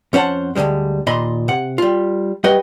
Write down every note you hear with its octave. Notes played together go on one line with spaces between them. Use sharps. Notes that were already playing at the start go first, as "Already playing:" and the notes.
F2 C#4 C5 F#5 A5
D2 G2 D3 G3 G#3
D#2 A#2 D#5 B5 C6
C3 F#5
G3 F4
G3 F#4 B4 D#5 G5